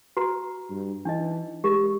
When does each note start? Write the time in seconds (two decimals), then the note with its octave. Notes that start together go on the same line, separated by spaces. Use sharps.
0.17 F#4 B4 A#5
0.70 G2
1.05 E3 D4 D#4 D#5
1.64 G#3 G4 A#4